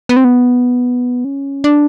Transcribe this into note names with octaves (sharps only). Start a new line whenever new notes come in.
B3
C4
B3
C#4
D4